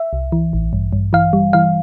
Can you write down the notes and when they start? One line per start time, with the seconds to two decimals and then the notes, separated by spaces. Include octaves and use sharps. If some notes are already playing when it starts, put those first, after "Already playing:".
Already playing: E5
0.13 C2
0.32 E3
0.53 A1
0.73 G2
0.93 G2
1.13 E3 F5
1.33 G3
1.53 E3 F5